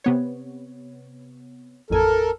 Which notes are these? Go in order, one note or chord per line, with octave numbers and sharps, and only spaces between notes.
C3 B3 C#5
A1 F2 A4 A#4 G#5